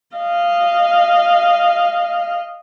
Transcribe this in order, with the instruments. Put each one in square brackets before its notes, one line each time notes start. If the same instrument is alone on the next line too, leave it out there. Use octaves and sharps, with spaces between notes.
[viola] D#5 F5